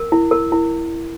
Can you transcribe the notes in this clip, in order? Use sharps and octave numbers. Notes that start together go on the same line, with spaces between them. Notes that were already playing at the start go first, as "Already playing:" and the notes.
Already playing: A#4
E4
A#4
E4